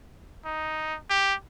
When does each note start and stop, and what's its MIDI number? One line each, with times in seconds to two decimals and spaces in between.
0.46 0.96 63
1.10 1.34 67